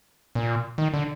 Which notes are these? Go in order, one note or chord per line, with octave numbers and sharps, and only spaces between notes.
A#2
D#3
D3